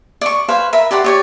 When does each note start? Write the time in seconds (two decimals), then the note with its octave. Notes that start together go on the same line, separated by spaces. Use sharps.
0.21 D5 C#6
0.48 B4 C5 F5 G#5
0.73 A#4 E5 B5
0.91 G4 D5 F#5 C6
1.04 G4 C#5 D5